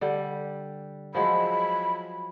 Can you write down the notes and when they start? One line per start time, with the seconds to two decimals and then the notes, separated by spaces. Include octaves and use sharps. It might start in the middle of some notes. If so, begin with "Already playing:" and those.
0.01 D3 G3
1.15 F3 F#3 G#3 B5